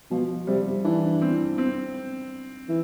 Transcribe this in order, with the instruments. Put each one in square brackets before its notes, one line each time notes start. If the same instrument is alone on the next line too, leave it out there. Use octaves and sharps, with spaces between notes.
[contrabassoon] B2 [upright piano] F3
[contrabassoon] C3 [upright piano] G3
[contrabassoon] E3 [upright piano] D4
[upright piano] C4
C4
[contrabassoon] E3